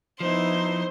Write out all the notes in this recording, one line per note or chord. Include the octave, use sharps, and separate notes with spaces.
F3 B3 D#4 E4 C5